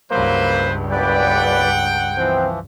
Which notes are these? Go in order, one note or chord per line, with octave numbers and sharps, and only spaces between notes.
C#2 G2 F#3 A#3 E4 B4 C5
F#1 B4 D5 F#5 G5
E3 F3 C4